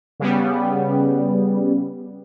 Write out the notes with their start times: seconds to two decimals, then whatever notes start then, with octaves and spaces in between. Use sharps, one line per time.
0.20 C#3 G3 B3